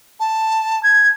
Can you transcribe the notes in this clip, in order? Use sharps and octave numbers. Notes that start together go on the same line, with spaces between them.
A5
G#6